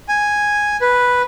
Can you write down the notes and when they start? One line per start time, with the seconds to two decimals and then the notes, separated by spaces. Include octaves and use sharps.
0.09 G#5
0.81 B4